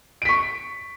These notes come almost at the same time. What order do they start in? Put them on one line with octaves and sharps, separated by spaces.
D7 B6 C#6